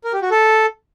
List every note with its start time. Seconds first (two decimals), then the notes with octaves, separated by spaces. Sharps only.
0.04 A#4
0.13 G4
0.22 F#4
0.31 A4